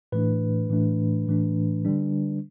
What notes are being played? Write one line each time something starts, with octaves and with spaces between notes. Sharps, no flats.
A2 E3 A3 D4 B4
A2 E3 A3 D4
A2 E3 A3 D4
D3 G3 D4